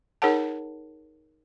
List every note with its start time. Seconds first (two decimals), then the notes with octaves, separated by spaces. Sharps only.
0.22 D#4 G#4 A#4 C#5 F#5 A5